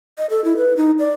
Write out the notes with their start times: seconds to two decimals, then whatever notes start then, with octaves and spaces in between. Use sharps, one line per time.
0.18 D#5
0.30 A4
0.45 E4
0.57 B4
0.77 D#4
0.99 D5